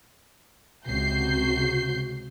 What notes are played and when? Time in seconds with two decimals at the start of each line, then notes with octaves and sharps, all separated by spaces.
0.87 C#2 C3 F#4 G6 C7